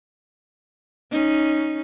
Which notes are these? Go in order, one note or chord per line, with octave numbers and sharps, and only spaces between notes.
C#4 D#4